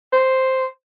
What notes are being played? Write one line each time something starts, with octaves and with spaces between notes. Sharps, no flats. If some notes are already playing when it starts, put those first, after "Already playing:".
C5